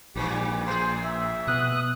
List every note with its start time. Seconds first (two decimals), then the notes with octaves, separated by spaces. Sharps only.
0.16 A#1 G2 A#2 E3 G4
0.66 A2 G#4 C5
1.04 E5
1.47 B2 B3 D#6 F#6